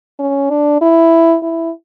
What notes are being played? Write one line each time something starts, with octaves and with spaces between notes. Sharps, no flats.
C#4
D4
E4
E4